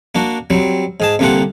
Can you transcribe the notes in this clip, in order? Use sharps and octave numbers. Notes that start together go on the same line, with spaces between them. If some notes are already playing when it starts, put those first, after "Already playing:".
A#3 D4 F#4
F#3 G3 C4
G#2 G#4 A5
C2 D3 A#3 F4 G4 F#5